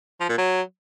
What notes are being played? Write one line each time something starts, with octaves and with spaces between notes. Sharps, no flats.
F3
A#2
F#3